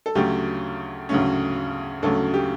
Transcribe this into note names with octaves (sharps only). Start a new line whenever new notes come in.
A4
D2 C#3 F#3 A3 C#4 G4
D2 C#3 F#3 A3 C#4
D2 C#3 F#3 A3 C#4 A4
G4